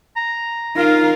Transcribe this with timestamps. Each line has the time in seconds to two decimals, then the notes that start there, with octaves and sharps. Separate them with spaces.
0.16 A#5
0.77 D#4 F4 A#4 F5